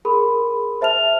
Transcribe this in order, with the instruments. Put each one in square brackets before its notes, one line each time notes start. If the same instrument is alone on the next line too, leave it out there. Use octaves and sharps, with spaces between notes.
[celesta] G#4 A#4 B5 C6
C5 E5 A5 F6 F7